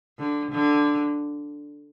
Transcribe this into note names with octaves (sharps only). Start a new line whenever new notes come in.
D3
D3